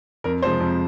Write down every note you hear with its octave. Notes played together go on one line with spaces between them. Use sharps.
F2 A#4
C3 F3 G#3 C5
F2